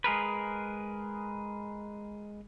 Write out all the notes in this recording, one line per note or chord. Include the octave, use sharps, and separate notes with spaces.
G#3 G#4 A#4 B4